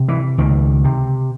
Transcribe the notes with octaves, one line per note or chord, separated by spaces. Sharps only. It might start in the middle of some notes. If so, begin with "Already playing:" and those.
Already playing: C3
E3
C#2 D#3
C3